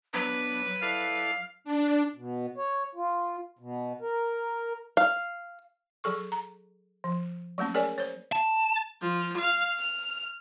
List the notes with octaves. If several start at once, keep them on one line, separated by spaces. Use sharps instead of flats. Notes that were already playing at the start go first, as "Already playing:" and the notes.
F#3 B3 D4 B4
E4 A4 D5 F5
D4
B2
C#5
F4
B2
A#4
F5
F#3 G#4 A4 C#6
A#5
F3
F#3 A3 A#3 C#4
G#4 A#4 C#5 D5 G#5
C5 C#5
A5
F3
F5
F6